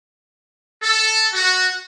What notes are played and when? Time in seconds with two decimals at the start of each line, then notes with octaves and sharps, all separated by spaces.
0.83 A4
1.34 F#4